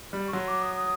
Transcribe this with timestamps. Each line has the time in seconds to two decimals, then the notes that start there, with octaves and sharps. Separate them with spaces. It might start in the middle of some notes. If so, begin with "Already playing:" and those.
0.13 G3
0.27 C#6
0.33 F#3 C6
0.47 D6
0.62 D#6
0.75 D#6